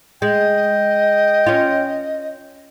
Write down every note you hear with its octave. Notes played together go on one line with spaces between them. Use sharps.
G#3 D#5 G5
C#4 F4